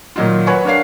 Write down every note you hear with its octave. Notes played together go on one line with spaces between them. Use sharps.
A#2 D#3 F#3 D#4 F4
F#4 B4 C#5 F#5 G#5 C#6
D4 A#4 C#5 F5 C7